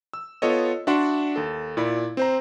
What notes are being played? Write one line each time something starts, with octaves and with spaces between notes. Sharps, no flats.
E6
B3 F4 A4 C#5 D#5
D4 F#4 D5 E5 F#5 C6
D#2 A4
A#2 E4 D5 B5
C4 C5 A#5